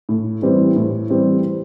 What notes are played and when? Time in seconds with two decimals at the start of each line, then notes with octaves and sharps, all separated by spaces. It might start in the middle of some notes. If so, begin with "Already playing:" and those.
0.09 A2
0.42 E3 G3 C4
0.76 A2
1.10 E3 G3 C4